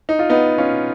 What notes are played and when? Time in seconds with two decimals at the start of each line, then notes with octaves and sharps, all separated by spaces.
0.09 D#4
0.19 F4
0.30 B3 D#4
0.58 C#4 F4